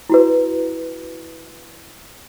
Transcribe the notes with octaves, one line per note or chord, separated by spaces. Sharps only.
E4 F#4 B4